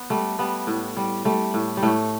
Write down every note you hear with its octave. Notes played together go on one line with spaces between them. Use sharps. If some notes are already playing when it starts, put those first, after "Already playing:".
Already playing: B3
G3 A3
G3 B3
A2
G3
G3 A3
A2
G3
A2 A3